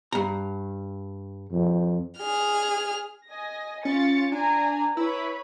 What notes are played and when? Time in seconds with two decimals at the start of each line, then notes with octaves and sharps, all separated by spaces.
0.12 G2 A#5
1.51 F2
2.18 G#4 F6
3.28 D#5 G#5 A#6
3.85 C#4 F4 A6 C#7
4.32 D4 G#5 A#5
4.97 E4 B4 C#5 B5